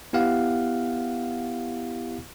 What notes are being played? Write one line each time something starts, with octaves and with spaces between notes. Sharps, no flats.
B3 E4 G4 F5 F#5